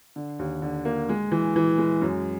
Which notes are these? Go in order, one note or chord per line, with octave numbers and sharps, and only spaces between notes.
D3
D#2
D3
A#3
G#3
E3
E3
G#3
F#2